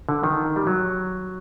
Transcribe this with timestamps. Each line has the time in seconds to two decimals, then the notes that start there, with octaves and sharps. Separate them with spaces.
0.09 D3
0.23 D#3
0.56 G3
0.67 F#3